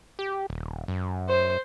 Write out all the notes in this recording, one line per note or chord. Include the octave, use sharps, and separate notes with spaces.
G4
D#1
F#2
C5